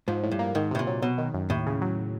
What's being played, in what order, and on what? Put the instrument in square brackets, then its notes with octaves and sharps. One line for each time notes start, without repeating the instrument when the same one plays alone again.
[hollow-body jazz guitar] G#2 [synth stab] F3
[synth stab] A2
[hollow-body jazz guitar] G2
[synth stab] A#3
[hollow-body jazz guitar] G#2 [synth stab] D#3
[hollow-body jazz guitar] A2 [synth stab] C3
[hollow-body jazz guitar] A#2
[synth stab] F#3
[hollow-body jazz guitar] B2 [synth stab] F#3
[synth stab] D#3
F#2
[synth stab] D#2 [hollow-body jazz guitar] A2
[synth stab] C#3
F#3